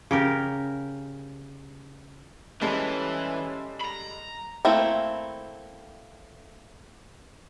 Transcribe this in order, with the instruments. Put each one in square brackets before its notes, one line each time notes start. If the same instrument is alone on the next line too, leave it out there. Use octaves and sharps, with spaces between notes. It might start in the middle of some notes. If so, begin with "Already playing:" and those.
[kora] C#3 G4 A#4
[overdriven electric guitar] E3 [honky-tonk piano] G3 G#3 A4 [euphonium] C#4
[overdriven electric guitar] A#5 B5
[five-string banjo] A3 A#3 C4 E4